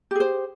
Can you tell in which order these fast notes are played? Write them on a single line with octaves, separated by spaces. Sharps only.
G4 G#4 C5